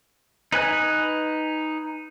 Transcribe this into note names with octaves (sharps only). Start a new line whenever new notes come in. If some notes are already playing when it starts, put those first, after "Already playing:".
D#4 B4 G#5 F#6